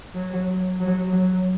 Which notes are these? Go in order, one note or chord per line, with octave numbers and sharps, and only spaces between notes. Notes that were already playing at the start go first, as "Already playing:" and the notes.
F#3
F#3
F#3